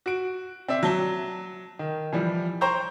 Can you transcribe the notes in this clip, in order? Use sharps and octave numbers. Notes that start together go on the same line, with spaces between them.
F#4 D7
C4 D5 E5
F#3 A5 G7
D#3
E3 F3 G3
C5 G5 A#5 C#6 G6